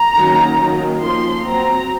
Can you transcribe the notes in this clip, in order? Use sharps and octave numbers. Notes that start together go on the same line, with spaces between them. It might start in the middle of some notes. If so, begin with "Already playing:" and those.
Already playing: A#5
D#3 F#3 A#3 C#4
D#3 F#3 A#3 C#4
F3 A#3 C#4 C6
F#3 C4 A#5